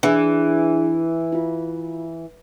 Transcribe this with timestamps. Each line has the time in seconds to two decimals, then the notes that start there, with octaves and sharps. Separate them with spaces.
0.03 E3 D4 G#4
1.32 E4 F4